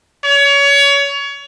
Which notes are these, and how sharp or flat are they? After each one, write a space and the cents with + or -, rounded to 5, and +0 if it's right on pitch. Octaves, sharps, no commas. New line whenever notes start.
C#5 +25